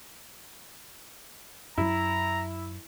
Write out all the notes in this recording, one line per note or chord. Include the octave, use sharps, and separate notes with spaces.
F#2 F#3 E4 A#5